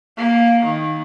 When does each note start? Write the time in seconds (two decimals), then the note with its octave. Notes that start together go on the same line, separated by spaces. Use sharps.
0.17 A#3
0.64 D#3